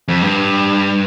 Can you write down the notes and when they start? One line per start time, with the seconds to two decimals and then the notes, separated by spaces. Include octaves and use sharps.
0.08 F2
0.22 G2